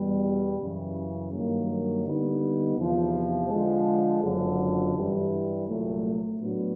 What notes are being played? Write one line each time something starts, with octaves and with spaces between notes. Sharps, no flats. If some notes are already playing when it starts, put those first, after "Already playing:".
Already playing: E2 B2 G3
F#2 C#3 E3
G2 D#3 F#3 A#3
D3 G3 B3 D#4
E2 C3 F3
D3 F3 G#3
F#1 F2 D3 F#3
G2 E3 G3
C2 A#2 F#3 A3
A2 F#3 B3 D4 F#4